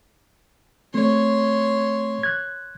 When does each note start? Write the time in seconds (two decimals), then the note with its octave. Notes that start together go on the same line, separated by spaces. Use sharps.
0.94 A3 C4 C#5 C6
2.23 F#6 G#6